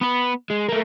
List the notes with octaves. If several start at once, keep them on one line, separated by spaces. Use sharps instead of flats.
B3 B4
G#3
A3 A#3